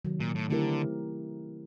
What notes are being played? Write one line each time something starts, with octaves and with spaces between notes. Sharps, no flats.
C3 D#3 F#3
A#2
A2
D3 A3 C4 E4 G4 A#4